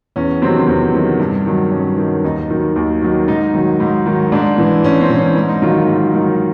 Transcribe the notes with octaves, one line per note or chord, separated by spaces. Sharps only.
E2 C#4
C3 D#3 F#3 C4
E2 C4
C3 D#3 F#3
G2
D#3 F#3
G2 C#4
D#3 F#3
D#2 D#4
D#3 F#3
D#2
D#3 F#3
G#2 D#4
D#3 F#3
G#2
D#3 F#3
G#2 D4
E3
G#2 C#4
C4
E3
C#4
G#2
D#4
D#3 F#3 F4
F4
G#2
D#3 F#3